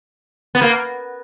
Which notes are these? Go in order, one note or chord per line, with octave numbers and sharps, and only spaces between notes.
B3
A#3